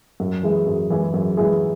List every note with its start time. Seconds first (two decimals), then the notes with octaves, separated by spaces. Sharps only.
0.20 F#2
0.43 E3 G#3 E4 G#4
0.67 F#2
0.90 E3 G#3 E4 G#4
1.14 F#2
1.37 E3 G#3 E4 G#4